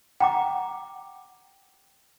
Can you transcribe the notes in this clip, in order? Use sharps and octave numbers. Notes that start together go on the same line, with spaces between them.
F#5 G5 A#5 D6